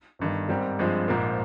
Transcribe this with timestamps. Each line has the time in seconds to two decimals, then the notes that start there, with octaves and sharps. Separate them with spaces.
0.19 G1 G2 D#3
0.49 G#2 G3 C4 G4 A#4
0.79 G2 F3 G#3 C4
1.08 A#1 G#2 F3 A#3